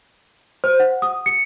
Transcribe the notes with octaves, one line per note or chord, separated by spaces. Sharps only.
C5
F#5
D#6
C#7